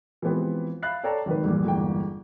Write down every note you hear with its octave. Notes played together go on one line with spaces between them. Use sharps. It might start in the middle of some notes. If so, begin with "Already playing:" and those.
E3 F3 G#3 B3 C4 G4
E5 F5 B5 F#6 A6 C7
A4 C#5 D5 G5 A5 A#5
G#1 D#3 B4
A#1 E2 G2 A#2
G1 E2 G#2 A#3 G5